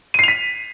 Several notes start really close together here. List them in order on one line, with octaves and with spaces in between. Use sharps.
D#7 C7 F7 B6